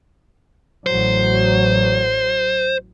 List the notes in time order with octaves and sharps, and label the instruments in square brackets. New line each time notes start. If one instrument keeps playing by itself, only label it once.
[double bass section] A1 F#3 [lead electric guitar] C5